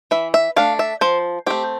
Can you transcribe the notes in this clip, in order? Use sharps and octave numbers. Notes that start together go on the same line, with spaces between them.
E3 E5
E5
A3 D4 F5
E5
F3 C5
A3 C4 G4